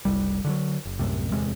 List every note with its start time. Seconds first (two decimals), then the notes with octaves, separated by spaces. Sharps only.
0.05 F#1 C2 G3
0.45 D3 D#3 F#3
0.85 F#1
0.99 C2 F#2 A2 C3
1.32 D1 E2 C3 G#3